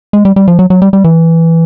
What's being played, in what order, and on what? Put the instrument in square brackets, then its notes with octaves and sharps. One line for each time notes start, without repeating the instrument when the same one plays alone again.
[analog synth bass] G#3
G3
G3
F3
F#3
F#3
G3
G3
E3